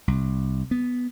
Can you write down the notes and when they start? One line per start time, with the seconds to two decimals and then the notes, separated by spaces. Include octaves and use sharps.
0.08 C2
0.71 B3